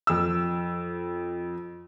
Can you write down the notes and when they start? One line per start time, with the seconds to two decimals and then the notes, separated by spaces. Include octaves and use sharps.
0.07 F2 E6